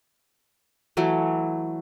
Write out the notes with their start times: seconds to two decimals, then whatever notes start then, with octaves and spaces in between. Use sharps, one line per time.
0.97 E3 F#3 A3